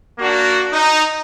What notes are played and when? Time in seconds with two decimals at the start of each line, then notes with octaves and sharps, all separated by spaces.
0.19 A#3 D4 F#4
0.71 D#4